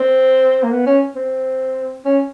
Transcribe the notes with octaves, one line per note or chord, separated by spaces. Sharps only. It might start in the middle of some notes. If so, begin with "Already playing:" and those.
Already playing: C4
A#3
B3
C#4
C4
C#4